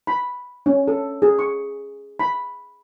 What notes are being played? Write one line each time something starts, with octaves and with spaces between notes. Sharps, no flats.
B5
C#4
A4
G#4
C#6
B5